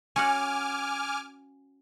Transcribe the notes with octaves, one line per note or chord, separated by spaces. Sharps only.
C#4 F#4 F#5 G#5 D6 F6